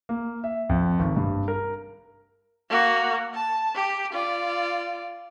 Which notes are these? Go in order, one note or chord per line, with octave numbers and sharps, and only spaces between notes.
A#3
E5
F2
G#1
G2
A#4
A#3 F#4
A5
G4
F4 D5